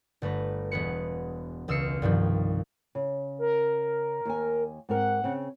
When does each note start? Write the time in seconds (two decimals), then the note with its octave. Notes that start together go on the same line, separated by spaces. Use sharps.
0.22 G1 A3 B4 A#5
0.71 E1 B3 G#4 B4 C#7
1.68 E1 C#2 E6 F6 C7 C#7
2.02 C2 G2 D#3 F3
2.95 C#3
3.39 A#4
4.25 D#2 G#5
4.89 G#2 C4 A#4 F#5
5.24 C#3 C4